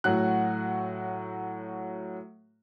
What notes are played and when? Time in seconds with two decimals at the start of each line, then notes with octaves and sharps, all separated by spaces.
0.04 A2 F#3 F#4 F#6